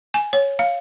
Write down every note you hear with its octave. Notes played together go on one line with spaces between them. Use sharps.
G#5
C#5
F5